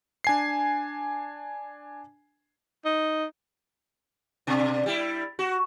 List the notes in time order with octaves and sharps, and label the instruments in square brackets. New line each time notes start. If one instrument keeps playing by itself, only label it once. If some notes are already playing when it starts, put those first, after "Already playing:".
[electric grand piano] D4 G#5 C7
[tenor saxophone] D#4
[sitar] B2 D4
G3 E4
F#4